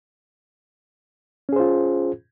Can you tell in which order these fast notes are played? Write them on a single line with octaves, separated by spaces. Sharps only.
C#4 G#4 C5 F4